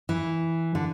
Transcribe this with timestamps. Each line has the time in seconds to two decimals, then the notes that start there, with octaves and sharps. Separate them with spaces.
0.09 E3
0.75 D3